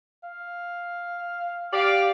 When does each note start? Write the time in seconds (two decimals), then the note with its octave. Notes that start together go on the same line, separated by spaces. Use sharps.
0.23 F5
1.73 G4 D5 F5